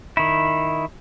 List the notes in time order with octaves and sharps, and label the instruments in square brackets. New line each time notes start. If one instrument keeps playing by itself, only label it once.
[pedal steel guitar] D#3 E4